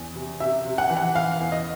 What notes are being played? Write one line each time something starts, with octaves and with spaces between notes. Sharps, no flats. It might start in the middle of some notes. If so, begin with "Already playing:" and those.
Already playing: E2
C3
C3 E5
C3
F#5
E3
F#5
E3 F5
E2
D#5